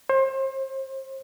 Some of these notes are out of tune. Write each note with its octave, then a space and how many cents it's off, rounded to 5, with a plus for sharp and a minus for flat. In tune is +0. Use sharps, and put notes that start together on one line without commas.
C5 +30